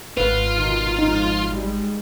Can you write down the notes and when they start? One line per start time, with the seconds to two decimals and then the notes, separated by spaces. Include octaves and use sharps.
0.17 G#1 F4 B4
0.53 B2 D#3
0.99 F2 G#2 D#4
1.49 G3 G#3